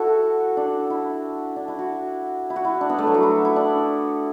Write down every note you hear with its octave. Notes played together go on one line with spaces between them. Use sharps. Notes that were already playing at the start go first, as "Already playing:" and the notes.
Already playing: E4 F#4 A4
D4
E4
D4
E4
F#4
E4
F#4
E4
D4
B3
A3
F#3
F#4
E4
E4
D4